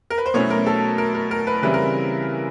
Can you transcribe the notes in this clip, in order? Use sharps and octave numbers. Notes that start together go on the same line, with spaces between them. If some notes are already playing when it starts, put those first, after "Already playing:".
A#4
B4
C5
B2 F#3 A3 C#4 E4 C#5
A#4
A4
A#4
A#4
A#4
B4
C#3 E3 G3 C4 E4 B4
A#4